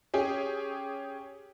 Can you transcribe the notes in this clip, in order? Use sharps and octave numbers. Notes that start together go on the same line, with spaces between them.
C#4 G4 G#4